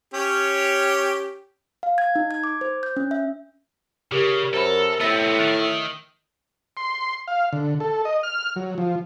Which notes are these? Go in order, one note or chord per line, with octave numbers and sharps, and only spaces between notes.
C#4 G4 C#5
F5
G#6
D#4
G#6
D6
C5
G6
C#4
E5
C#3 G4 A#4
F#2 A4 A#4 C5 B5
A2 B3 C4 E5 A6 A#6 D#7
D#3 F#6 A6
C6
F5
D3
A4
D#5
F6
F#3
F3